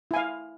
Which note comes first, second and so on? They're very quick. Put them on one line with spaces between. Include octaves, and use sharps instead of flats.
E4 G#5 F5